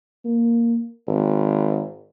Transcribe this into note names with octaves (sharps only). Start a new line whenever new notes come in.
A#3
G#1